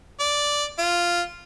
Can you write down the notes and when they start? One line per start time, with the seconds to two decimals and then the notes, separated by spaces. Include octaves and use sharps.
0.20 D5
0.79 F4